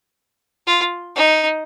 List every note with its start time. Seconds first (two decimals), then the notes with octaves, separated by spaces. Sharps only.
0.67 F4
1.16 D#4